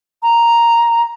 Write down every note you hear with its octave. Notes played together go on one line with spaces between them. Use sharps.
A#5